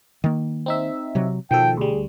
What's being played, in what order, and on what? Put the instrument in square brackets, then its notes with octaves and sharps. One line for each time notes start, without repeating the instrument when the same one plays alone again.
[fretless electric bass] D#3 A#3
[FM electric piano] C4 D#4 E5
[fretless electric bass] C3 F#3
[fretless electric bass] B2 [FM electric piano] D#3 F3 A4 [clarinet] G5
[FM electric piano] D2 G3 [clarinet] G#4